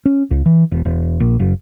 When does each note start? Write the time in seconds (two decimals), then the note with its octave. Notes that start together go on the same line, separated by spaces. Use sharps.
0.06 C#4
0.31 C#2
0.46 E3
0.72 E1
0.85 E1
1.20 A#1
1.40 F#1